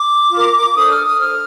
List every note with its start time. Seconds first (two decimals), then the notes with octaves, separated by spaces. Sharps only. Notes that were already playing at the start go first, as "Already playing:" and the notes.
Already playing: D6
0.31 F4 A#4
0.75 D4 A4 C5 D#6
0.90 F6
1.05 D#6
1.19 D4 A4 C5 F6